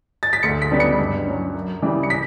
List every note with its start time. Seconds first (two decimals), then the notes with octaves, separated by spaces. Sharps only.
0.23 A6
0.33 B6
0.43 D2 C#7
0.62 B6
0.71 C#3 G3 B3 D4
0.80 C#7
0.99 G2
1.27 F#3 C#4
1.54 F#2
1.82 C#3 E3 G3
2.03 C#7
2.10 B6